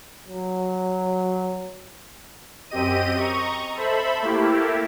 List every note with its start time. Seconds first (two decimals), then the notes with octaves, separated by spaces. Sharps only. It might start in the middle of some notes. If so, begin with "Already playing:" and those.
0.28 F#3
2.70 F#2 C4 G4 D#5 D#7
3.18 D#5 A#5 C#6
3.75 A4 C5 E5 B5
4.22 A3 A#3 E4 G4